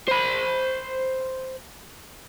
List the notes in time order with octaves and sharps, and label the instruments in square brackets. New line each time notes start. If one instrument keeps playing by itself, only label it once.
[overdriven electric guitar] C5 B5